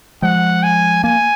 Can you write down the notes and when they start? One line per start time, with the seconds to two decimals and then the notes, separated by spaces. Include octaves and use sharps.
0.22 F3 G#3 F#5
0.63 G#5
1.04 A#3 G#5